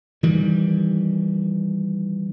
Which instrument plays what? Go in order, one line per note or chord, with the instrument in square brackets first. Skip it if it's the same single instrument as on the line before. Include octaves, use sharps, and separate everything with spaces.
[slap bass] D#3 E3 G3